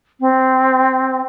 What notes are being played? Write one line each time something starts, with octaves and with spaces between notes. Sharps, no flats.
C4